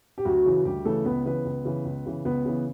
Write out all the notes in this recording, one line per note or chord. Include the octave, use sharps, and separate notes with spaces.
G4
D2 F#3 F#4
C#3 E3
D2 G3 G4
C#3 E3 A3 A4
C#2 B3 B4
C#3 E3 B3 B4
C#2
C#3 E3
C#2
C#3 E3
C#2 B3 B4
C#3 E3